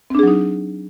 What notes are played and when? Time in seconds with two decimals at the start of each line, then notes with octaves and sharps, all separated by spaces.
0.10 C4
0.15 D4
0.19 G#4
0.23 F#3
0.28 D#4